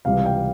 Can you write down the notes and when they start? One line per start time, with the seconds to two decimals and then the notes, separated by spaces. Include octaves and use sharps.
0.05 C#2 C3 E3 G3 F5
0.26 G5